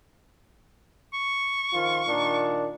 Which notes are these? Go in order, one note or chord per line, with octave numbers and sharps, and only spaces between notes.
C#6
D#3 F3 F4
A#2 D#3 D4